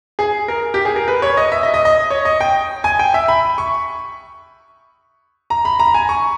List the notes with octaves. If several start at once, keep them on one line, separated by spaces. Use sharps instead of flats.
G#4
A#4
G4
G#4
A#4
B4
C#5
D#5
E5
D#5
D#5
D#5
C#5
D#5
G5
G#5
G5
E5
B5
C#6
A#5
B5
A#5
G#5
C#6